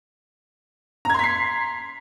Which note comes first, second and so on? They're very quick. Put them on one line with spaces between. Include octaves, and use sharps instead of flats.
A#5 G#6 C6 B6 C7